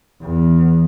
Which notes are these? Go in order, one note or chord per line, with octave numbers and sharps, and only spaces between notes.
E2